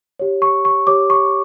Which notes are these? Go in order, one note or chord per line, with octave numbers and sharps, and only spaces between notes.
G4 C#5
C#6
C#6
G4 C#5 D6
C#6